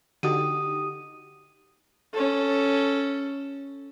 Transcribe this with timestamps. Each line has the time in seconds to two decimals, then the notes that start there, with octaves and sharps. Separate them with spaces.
0.23 D3 D#4 F#4 G4 D#6 D#7
2.14 C#4 A4